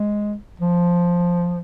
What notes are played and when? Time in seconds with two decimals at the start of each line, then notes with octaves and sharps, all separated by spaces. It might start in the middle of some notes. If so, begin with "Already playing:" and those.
Already playing: G#3
0.60 F3